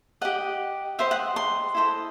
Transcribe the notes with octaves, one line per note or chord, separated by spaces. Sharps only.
G4 D#5 F#5
G4 C5 D#5 E5
F#5
C6
E4 A4 C5 D#5